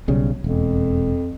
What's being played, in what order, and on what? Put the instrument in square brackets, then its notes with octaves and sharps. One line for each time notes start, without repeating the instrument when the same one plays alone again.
[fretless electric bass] B1 C#3 G3
[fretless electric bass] E1 [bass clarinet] F2